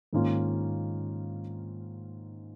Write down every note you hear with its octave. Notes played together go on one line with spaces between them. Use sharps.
G#2 D#3 A#3 C#4 F4